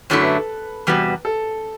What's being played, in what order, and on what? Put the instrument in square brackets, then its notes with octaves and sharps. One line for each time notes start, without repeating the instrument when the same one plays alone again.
[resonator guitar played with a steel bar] F#2 D3 F#3 A3 E4 [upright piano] A4
[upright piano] B4
A4
[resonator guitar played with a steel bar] E2 C3 G3 B3 F#4
[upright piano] A4